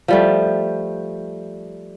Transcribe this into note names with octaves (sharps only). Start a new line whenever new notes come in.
F3 G3 A3